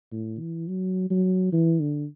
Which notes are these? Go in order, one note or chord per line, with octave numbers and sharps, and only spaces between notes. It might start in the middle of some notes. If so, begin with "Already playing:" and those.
A2
E3
F#3
F#3
E3
D3